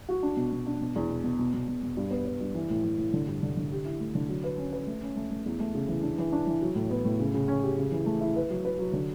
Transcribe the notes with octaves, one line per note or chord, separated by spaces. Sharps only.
F#4
D4
B2
B2
D4
B2
E2
B2
B2
B2
B2
B2
B2
G2
B3
B3
G2
E3
A2
E3
A2
D3
G2
D3
D3
G4
E4
A3
D3
F#3
B4
C#4
B4
A3
C#4
A3
A3
E2
A3
C#3
E3
D4
E3
D4
E3
F#3
A2
B3
A2
C#3
C#3
C#4
G4
C#3
E3
A3
E4
B4
F#3
B4
F#3
D3